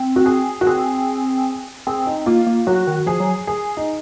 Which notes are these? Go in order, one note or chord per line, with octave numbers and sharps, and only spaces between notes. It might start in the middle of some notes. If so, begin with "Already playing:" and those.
Already playing: C4
F#4
G#4
F#4
C4 G#4
C4 G#4
D#4
A#3 F4
A#3
F#3 F#4
D#3
F3 G#4
F#3
G#4
D#4